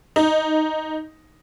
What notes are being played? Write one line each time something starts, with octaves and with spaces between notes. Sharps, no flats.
D#4